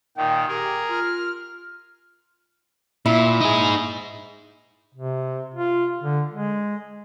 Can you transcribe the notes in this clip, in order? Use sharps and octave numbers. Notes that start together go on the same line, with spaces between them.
A#2 D#3 G5
G4 G#4 A#4
F4 F6
A#2 E4
D#4 G#4
C3
F4
D3
G#3